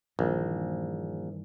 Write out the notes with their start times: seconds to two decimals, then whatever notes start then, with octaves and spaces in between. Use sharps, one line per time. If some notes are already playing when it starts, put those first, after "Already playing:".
0.19 A#1 G2 D#3 E3